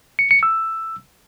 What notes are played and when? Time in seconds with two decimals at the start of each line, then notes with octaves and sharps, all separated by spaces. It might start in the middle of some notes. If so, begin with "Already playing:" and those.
0.19 C#7
0.31 C#7
0.43 E6